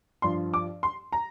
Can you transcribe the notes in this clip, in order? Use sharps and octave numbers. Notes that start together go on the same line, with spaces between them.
G2 F3 C6
D6
C6
A#5